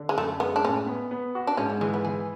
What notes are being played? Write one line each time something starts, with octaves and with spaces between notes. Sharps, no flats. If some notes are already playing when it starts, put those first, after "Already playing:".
Already playing: D3
G#3
F#2 A3
G#3 B3
D4
A2 C#4
B3
B3
F#4
D4
G#2 C#4
F#3
E3 G#3
B3
E3 G#4